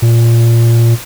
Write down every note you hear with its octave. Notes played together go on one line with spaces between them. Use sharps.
A#2